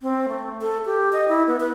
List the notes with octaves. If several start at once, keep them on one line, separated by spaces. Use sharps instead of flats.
C4
A3
A4
G4
D#5
E4
B3
B4